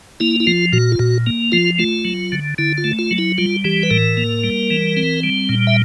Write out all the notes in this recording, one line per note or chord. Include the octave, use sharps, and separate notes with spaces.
A#3 E4
E4
F3 F4
A#2 F#4
F4
A#2 F#4
A#3
F3 F4
A3 F4
F#3
D3
D3 E4
F4
A3
F4
F#3
E4
G3 F4
E3 G4
B4
A2 A#4
A#3
G3
E3
C4
G3
A#2
E5